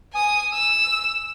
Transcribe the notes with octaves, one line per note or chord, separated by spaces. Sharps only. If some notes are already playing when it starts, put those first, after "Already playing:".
G#5 D#6
E6